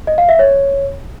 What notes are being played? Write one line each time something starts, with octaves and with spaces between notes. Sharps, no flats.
D#5
F5
E5
C#5